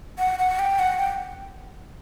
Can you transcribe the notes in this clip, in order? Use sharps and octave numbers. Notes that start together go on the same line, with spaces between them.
F#5
F#5
G5
F#5
G5